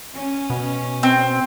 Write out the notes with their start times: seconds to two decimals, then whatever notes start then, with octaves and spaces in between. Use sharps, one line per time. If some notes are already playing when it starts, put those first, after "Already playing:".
0.13 C#4
0.50 B2
1.03 C4